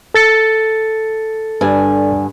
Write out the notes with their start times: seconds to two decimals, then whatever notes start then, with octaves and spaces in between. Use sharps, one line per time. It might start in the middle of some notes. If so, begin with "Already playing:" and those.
0.14 A4 A6 C#7
1.61 G2 D3 G#5